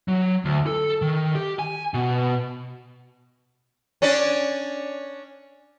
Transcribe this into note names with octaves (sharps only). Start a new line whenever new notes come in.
F#3
D2
A4
D#3
G4
G#5
B2
C#4 D4 D5